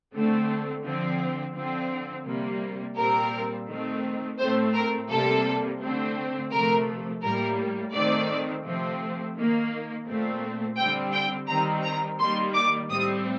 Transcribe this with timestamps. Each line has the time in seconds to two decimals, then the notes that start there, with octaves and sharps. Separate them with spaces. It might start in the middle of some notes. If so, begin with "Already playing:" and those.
0.14 D3 A3 C4
0.84 D3 F3 C4
1.55 D3 F3 C4
2.26 C3 G3 A#3
2.97 A#2 G3 C4 A#4
3.69 D#3 A3 C4
4.39 A2 A3 C4 C5
4.74 A#4
5.09 C3 G3 A#3 A4
5.81 D3 A3 C4
6.51 C3 F3 A3 A#4
7.23 A2 G3 A#3 A#4
7.93 D#3 A3 C4 D5
8.64 C3 F3 A3 C4
9.36 D#3 A#3
10.07 A#2 A3 C4
10.77 D3 G3 C4 G5
11.13 G5
11.48 D#3 G3 C4 A#5
11.83 A#5
12.19 D#3 G3 A#3 C6
12.55 D6
12.90 A2 G3 C4 D#6